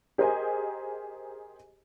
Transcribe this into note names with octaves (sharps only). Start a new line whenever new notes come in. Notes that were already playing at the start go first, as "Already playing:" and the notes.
G4 G#4 A#4 C5 D#5 G#5